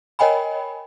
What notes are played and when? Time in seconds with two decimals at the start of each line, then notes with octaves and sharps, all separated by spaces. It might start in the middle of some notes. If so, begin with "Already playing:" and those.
0.19 A#4 C#5 D#5 G5 G#5 B5